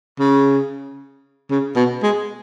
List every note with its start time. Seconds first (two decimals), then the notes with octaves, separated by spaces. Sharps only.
0.20 C#3
1.51 C#3
1.76 B2
2.03 G#3